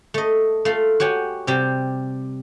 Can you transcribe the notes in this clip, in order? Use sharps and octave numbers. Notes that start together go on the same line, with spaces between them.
A3 D#5
A3 F4 F5
F#4 G4 C#5 G#5
C3 G3 G4